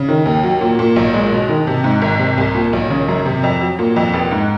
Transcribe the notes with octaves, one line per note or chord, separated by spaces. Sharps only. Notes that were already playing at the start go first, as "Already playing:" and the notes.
Already playing: C#3
D#3
D#2
F#3
A#2
A#2
B1
G#3
B2
D#3
C3
G#2
G#1
C3
C2
A#2
B1
C#3
F#2
C3
F2
F#3
A#2
F2
F1
G#2